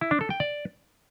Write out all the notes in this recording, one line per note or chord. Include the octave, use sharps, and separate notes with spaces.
E4
D4
A4
G5
D5